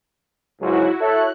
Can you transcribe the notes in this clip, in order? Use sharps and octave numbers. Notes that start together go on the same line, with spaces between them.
C#2 G#2 F#3 E4 F#4
A4 C#5 E5 F#6